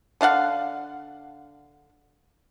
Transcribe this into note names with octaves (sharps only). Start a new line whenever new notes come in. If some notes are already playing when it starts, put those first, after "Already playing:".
D3 D4 F5 F#5